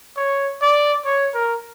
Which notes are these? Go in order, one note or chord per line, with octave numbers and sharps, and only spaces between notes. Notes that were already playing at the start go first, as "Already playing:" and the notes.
C#5
D5
C#5
A#4